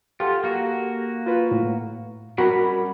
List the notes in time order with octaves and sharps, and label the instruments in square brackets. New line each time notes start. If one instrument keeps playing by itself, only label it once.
[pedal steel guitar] F4 [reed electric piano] G4 A4 F#5
[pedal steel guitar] A#3 F#4
[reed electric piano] F4 B4
A2
[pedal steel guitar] G3 C#4 B5 [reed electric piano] F#4 A#4 F#5